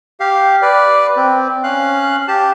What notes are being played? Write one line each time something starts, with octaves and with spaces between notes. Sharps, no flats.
G4 F5
B4 D5
C4
C#4 F5 F#6
G4 A5